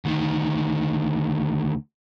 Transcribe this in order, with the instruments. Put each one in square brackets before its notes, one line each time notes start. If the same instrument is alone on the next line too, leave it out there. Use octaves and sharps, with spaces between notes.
[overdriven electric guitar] D2 D#3